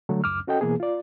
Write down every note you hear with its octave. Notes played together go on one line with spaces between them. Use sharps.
D3 F#3 G3 A3
C#2 F#2 D6 F6
C#4 F#4 A4 D#5 G5
B2 E3 A#3 B3 G#4
F4 D5